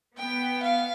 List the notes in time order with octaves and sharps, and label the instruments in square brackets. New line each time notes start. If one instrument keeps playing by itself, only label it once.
[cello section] B3 [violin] G5
[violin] F5